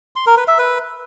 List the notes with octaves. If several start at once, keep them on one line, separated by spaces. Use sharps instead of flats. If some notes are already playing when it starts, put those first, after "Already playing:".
C6
A#4
B4
E5
B4